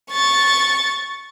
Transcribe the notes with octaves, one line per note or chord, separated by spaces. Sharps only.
C#6 A6